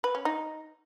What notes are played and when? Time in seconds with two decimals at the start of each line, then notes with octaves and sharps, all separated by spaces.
0.04 B4
0.15 C#4
0.25 D#4